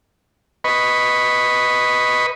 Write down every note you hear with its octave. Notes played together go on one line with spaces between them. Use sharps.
B4 D#5 B5 C#6